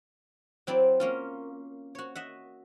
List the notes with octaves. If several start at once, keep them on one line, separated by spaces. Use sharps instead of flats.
F#3 C4 E4 D5
A#3 C#4 F4
F#4 C#5
D#5 E5 F#5